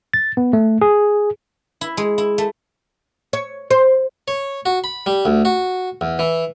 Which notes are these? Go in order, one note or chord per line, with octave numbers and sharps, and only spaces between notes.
A6
B3
A3
G#4
E4
G#3
E4
A3
C#5
C5
C#5
F#4
B5
G3
D2
F#4
E2
E3